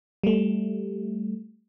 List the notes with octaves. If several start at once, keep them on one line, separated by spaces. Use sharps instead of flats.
G3 A3